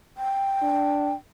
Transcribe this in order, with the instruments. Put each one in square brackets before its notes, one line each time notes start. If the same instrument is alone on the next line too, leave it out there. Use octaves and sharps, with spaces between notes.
[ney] G5
[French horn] D4